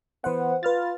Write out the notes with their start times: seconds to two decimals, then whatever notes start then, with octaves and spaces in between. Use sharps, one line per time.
0.24 E3 B3 C5 F#5
0.63 F4 B4 F6 A6